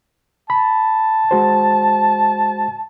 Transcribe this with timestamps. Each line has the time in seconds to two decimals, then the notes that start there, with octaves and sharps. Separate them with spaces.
0.50 A5 B5
1.31 G#3 F#4 C5